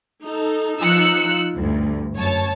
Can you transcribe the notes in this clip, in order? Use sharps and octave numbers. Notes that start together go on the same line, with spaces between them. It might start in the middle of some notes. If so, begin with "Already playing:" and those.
D#4 A4
F3 D#4 F4 E6 F#6 C#7
D2 G2
F#2 C#5 A5